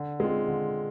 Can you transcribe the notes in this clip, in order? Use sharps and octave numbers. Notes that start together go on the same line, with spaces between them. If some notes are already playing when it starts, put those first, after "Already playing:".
Already playing: D3
G#3 C4 F4
D3